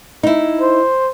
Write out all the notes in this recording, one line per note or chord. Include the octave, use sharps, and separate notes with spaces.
D#4 E4
C5